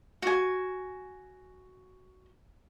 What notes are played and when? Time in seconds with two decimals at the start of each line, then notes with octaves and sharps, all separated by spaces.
0.22 F#4 G#5